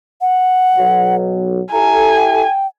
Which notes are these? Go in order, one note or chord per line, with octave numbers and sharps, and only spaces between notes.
F#5
B1 F#3
E4 G4 A4 G#5 A#5
G5